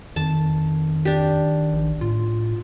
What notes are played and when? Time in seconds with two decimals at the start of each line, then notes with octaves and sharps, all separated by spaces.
0.16 F2 D#3 A5
1.05 D4 G4
1.73 A#1
2.01 A2 F4